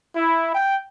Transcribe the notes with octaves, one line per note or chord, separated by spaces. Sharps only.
E4
G5